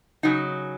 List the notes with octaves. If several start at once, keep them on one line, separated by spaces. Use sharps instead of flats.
C#3 F#3 D#4